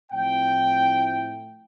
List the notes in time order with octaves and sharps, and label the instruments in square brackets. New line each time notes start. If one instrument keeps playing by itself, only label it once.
[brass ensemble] A2 F3 C4 E4 G5